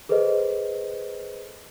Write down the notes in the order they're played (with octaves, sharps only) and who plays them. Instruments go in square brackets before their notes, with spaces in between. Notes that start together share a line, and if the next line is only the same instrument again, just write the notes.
[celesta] G#4 A4 B4 C5 D#5